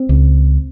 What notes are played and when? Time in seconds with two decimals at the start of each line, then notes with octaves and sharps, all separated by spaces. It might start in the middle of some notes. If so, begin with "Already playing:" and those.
Already playing: C4
0.09 C#2